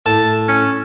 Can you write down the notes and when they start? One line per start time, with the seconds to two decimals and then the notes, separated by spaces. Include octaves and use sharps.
0.06 A2 A5
0.48 C#4